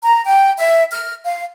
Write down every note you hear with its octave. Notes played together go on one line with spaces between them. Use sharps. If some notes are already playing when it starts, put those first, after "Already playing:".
A#5
G5
E5
F6
F5